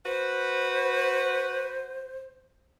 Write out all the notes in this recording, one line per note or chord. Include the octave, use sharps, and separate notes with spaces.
F#4 B4 C5